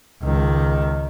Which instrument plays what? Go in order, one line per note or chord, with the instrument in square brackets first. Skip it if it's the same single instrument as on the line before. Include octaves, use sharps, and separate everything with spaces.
[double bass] C#2 D#3